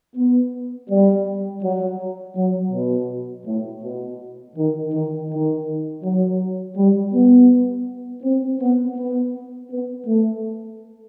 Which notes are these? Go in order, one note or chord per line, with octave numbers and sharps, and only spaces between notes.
B3
G3
F#3
F#3
B2
A2
B2
D#3
D#3
D#3
F#3
G3
B3
C4
B3
B3
B3
A3